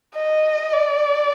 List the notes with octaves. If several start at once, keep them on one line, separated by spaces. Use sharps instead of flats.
D#5
D5